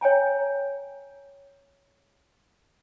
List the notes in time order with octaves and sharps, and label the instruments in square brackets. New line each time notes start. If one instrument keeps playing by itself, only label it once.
[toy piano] C#5 G5 G#5 A#5